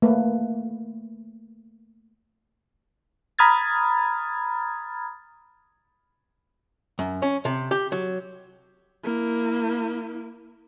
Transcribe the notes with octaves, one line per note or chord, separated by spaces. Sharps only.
A3 A#3 B4
A#5 B5 D#6 F6 G#6 A6
F#2
C#4
C3
G4
F#3
A#3 E4